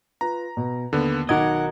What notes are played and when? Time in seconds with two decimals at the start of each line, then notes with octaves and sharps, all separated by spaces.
0.21 F4 B4 A#5
0.57 B2
0.93 D#2 D3 B3
1.29 B1 D#3 F#4 A#4 D#5 F#5 D6 G#6